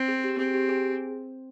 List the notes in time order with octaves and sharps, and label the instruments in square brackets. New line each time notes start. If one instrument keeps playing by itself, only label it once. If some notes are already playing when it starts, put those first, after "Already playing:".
Already playing: [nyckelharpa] C4
[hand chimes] G#4
G4
[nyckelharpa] C4 [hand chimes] G#4
[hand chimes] G4
G#4